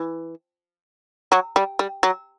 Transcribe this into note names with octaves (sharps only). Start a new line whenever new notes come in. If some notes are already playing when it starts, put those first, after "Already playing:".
Already playing: E3
F#3
G3
G3
F#3